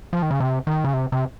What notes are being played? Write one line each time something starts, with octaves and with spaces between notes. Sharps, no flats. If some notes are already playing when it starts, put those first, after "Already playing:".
F3
D#3
C#3
C3
D#3
C#3
C3
C3